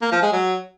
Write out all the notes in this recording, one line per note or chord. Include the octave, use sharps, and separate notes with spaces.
A#3
F3
G#3
F#3